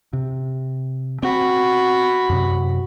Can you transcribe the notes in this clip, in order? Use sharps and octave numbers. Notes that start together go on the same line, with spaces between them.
C3
C4 F#4 B5
F#2 C3